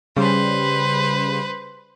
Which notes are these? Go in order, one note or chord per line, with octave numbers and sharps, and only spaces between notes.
C#3 G3 B4 C5